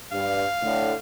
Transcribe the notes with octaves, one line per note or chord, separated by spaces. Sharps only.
G2 F5
A2 D3